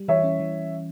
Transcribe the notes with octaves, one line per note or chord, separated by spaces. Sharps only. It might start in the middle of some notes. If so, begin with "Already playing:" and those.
Already playing: G3
E3 C#5 E5
C#4
E3